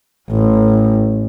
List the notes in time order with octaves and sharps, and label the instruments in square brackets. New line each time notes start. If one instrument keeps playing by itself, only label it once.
[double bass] A1